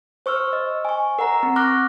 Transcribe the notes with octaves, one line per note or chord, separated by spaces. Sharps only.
C5 C#6 E6 F6
D#5
G#5 C#6
A#4 F#5 A#5
C4
C#6 D6 F6 F#6 A#6